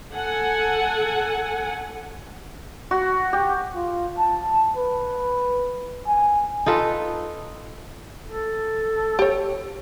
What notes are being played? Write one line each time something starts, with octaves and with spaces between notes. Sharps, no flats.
A4 F#5 G#5
F#4
G4
F4
A5
B4
G#5
D#4 F4 A4 B4
A4
G4 C#5